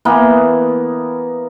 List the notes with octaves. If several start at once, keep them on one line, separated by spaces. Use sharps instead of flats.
E3 A#3 B3